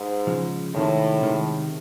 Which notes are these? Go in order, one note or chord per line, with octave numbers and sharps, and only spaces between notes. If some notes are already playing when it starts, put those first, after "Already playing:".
Already playing: G#2
C#3 F3 G#3
A2 C3 D#3 G#3
C3 D#3 G#3